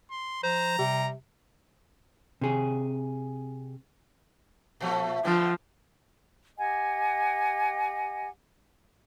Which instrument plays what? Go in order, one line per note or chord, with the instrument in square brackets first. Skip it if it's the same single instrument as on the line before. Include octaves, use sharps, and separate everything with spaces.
[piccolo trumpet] C6
[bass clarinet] F3 [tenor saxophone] C5 [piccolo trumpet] A#5
[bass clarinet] C3 [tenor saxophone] G3
[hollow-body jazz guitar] C3 G#4
[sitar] A#2 F3 A3
[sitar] D3 A3 B3 [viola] F3
[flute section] G4 D#5 F#5 G#5